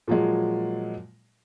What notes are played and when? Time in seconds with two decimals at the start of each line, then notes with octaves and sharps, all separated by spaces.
0.08 A#2 F3 F#3 G#3